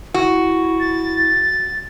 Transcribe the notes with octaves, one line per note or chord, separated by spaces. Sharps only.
E4 F#4
A6